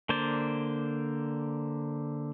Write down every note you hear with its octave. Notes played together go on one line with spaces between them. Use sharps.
D3 A#3 C5 D5